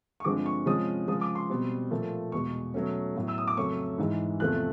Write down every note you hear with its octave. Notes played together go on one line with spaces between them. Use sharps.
C#6
G2 D3 F3 G#3 C4 D6
C#6
C3 F3 G#3 C#4 D#6
C#3 F3 G#3 D#6
D6
C6
B2 G3 C4
A#2 F3 A3
E2 B2 G#3 C#6
B2 F#3 A3 C#4
A2 F#3 B3
E6
D#6
D6
F2 C#3 F#3 A3 C#4 C#6
G#2 E3 G#3
E2 C3 F3 A3 C4 F#6